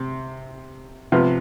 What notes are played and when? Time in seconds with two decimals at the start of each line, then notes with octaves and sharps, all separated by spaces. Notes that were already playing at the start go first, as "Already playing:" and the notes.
Already playing: C3
1.12 C3 F3 B3 F4